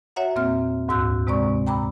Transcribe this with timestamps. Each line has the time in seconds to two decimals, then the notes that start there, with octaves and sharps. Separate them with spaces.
0.16 F#4 C#5 E5 F#5 A#5
0.35 E2 A#2 A#3 C4 E5 F6
0.88 D2 G#2 F#4 E6 F#6 G6
1.27 C3 G#3 C4 D5 A#5 C#6
1.67 G5 A#5 B5 D6 E6